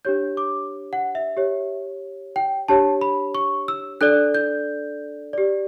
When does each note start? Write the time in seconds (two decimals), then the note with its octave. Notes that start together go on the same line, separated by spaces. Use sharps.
0.05 D4 G4 C#5 G6
0.37 D6
0.93 F#5
1.15 E5
1.37 G4 C#5
2.36 G5
2.68 D4 G4 C#5 A5
3.01 B5
3.35 C#6
3.68 E6
4.01 D4 A4 D5 F#6
4.34 G6
5.33 G4 D5